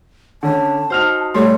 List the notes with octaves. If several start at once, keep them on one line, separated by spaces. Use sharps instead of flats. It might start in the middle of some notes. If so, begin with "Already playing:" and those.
D3 C#4 A5
D#4 F#4 C5 F6 F7
G3 A3 A4 C#5 C6